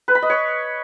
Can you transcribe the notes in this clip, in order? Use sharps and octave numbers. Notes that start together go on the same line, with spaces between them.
B4
B5
D#5
C#5